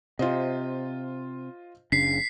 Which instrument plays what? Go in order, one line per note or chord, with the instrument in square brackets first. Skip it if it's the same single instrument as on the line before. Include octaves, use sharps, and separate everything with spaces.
[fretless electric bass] C3 [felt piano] F4 C5 D#5
[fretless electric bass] F#1 C#3 D4 [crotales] B6 C7